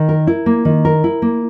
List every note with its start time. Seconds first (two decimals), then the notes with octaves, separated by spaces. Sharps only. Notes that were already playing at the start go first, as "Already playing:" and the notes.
Already playing: D#3
0.09 A#4
0.27 E4
0.46 A#3
0.65 D#3
0.85 A#4
1.04 E4
1.22 A#3